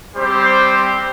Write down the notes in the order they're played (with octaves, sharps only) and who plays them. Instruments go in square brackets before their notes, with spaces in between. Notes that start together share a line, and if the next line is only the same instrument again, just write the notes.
[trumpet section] G3 C4 G4 C5